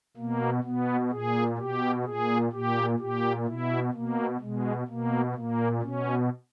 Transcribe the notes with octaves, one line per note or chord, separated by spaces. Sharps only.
B2 A#3
B2 B3
A#2 G#4
B2 G4
A#2 G#4
A#2 G4
A#2 G4
B2 E4
B2 A#3
B2 G#3
B2 A#3
A#2 A#3
B2 C#4